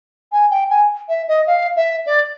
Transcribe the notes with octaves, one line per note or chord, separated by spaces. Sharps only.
G#5
G5
G#5
E5
D#5
F5
E5
D5